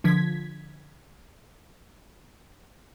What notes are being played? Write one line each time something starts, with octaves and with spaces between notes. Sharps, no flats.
D3 F3 G#6 B6